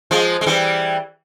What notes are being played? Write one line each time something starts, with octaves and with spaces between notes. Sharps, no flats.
F3 G#3
G#3
E3 G3